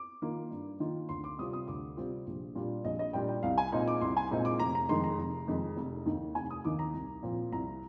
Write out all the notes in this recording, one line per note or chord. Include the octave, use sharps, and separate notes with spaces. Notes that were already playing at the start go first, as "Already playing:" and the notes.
Already playing: D6
D#3 A#3 F4
G2
D#3 A#3 F4
D2 C6
D6
C3 G3 C4 F4 D#6
D#6
D2 D6
C3 G3 C4 F4
A#1
A#2 G3 D4 F4
A#1 D#5
D#5
A#2 G3 D4 F4 G5
G5
C2 F5
G#5
A#2 G#3 C4 D#4
D6
C2 C6
G#5
A#2 G#3 C4 D#4
D6
F1 A#5
A#5
F2 D#3 G#3 C6
A#5
F1
F2 D#3 G#3
F1
D#2 D#3
F1 G#5
D#6
D#2 D#3 D6
A#5
C2
A#2 F3 C4
C2 A#5